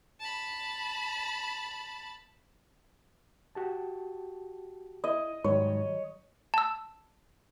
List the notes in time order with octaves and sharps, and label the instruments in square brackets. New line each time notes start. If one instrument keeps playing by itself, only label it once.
[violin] A5 B5
[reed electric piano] F#4 G4 A5
[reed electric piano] E4 [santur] D#5
[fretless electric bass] G#2 [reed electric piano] D#3 F#3 G3 [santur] C#5
[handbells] A5 E6